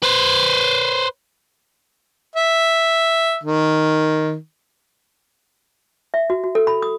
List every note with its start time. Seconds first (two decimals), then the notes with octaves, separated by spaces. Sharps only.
0.03 B4 C5
2.36 E5
3.44 D#3
6.14 E5
6.30 F#4
6.44 F#4
6.55 A4
6.67 B5
6.82 D#6